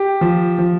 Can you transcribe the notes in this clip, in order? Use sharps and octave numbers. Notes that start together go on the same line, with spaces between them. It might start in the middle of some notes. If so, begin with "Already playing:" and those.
Already playing: G4
F3
F3